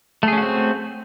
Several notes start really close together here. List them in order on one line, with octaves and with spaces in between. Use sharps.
A3 G#4 C#4 F#4 C4